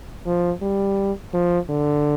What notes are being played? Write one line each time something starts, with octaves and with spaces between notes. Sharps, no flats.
F3
G3
F3
D3